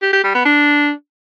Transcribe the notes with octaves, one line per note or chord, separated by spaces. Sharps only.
G4
G4
G3
B3
D4